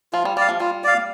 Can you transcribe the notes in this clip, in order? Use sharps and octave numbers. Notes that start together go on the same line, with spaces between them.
F3 F4
G3
G3 D5 F5
F3
G3 F4
D5 F5